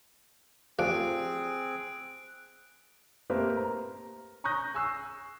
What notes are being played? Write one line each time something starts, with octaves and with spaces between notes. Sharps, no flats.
A1 F3 C4 D4 G#4 F5 F#6 D7
A3 A#3 C4 G4 A#4 B4
A#5
A#5 C#6 D#6 F#6 G6 A#6
G#5 C#6 E6 F#6 C7